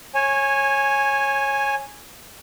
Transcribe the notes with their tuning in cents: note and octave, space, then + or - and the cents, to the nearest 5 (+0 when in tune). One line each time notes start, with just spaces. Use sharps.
C#5 -20 G#5 +0